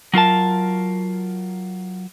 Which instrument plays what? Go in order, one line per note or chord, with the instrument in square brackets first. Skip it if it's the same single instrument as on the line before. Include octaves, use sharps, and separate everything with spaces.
[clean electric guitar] F#3 F4 A#4 A5